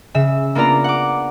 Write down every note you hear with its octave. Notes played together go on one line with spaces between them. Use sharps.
C#3 E5 E7
A#3 B3 D4 F4 D5 A#5
F#5 D6